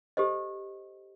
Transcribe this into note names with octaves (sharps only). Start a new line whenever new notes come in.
G4 A4 C5 D#5